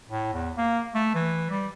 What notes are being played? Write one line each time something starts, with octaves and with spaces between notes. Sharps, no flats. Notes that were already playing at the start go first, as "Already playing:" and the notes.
A2
E2
A#3
A3
E3
G3